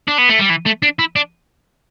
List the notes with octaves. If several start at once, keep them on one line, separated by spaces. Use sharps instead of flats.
D4
B3
A3
G3
E3
A3
D4
E4
D4